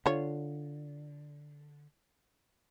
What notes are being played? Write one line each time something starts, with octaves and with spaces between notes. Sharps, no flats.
D3 F4 C#5